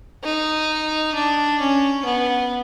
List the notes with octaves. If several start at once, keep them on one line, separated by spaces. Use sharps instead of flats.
D#4
D4
C#4
B3